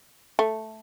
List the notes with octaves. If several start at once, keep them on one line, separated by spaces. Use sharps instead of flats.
A3